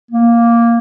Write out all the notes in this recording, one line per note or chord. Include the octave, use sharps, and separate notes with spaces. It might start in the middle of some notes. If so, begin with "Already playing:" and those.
A#3